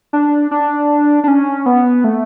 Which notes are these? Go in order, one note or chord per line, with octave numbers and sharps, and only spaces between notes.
D4
D4
D4
C#4
B3
A3